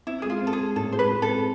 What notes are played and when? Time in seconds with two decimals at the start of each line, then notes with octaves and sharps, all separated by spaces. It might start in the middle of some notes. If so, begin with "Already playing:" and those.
0.07 C4 E4
0.22 G#3 G#4
0.30 F4
0.41 C4
0.47 A4
0.53 G#4
0.59 G#3
0.76 A2 A4
0.92 G#3 C5
0.99 B4
1.11 G#3
1.22 A4
1.28 C4